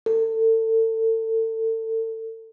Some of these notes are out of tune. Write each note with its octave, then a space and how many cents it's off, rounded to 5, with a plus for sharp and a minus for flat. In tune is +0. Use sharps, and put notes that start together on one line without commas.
A4 +30